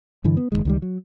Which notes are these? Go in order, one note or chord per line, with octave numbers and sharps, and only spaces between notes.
G2 D3 E3
B3
F#1 D#2 D#3 G#3
C#2 D#3 G3
F#3